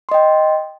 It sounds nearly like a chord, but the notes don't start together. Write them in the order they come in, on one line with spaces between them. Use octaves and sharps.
C6 D#5 G5